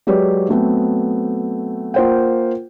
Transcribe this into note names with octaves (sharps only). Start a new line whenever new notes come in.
F#3 G#3 G4 B4 C#5 D5
F#3 A3 B3 C4
A#3 F4 C5 F#5 G5